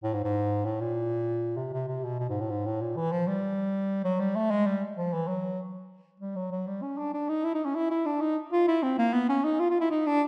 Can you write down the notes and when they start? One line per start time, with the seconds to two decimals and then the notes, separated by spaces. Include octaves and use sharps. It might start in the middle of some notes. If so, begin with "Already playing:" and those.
0.03 A2
0.14 G#2
0.24 G#2
0.65 A2
0.80 A#2
1.57 C3
1.73 C3
1.88 C3
2.04 B2
2.19 B2
2.29 G#2
2.40 A2
2.50 G#2
2.66 A2
2.81 A#2
2.96 E3
3.12 F3
3.27 G3
4.04 F#3
4.20 G3
4.35 A3
4.50 G#3
4.66 G3
4.97 F3
5.13 E3
5.27 F#3
6.20 G3
6.36 F#3
6.51 F#3
6.67 G3
6.82 C#4
6.98 D4
7.14 D4
7.29 D#4
7.44 E4
7.54 D#4
7.65 C#4
7.75 E4
7.90 E4
8.06 D4
8.20 D#4
8.52 F4
8.67 E4
8.83 C4
8.98 A#3
9.13 B3
9.29 C#4
9.44 D#4
9.60 F4
9.70 F4
9.81 E4
9.91 D#4
10.06 D4